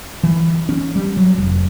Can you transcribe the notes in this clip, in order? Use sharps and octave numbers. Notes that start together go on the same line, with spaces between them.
E3
C#4
G3
F#3
F1